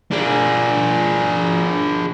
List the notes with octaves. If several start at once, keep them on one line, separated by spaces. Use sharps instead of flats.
D4 G#4